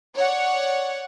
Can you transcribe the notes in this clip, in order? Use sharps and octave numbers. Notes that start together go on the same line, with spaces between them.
C#5 D5 F#5